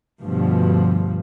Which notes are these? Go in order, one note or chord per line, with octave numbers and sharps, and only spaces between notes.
D2 G2 B2 F3